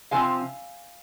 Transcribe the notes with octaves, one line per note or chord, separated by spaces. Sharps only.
C3 F3 C4 F5 G#5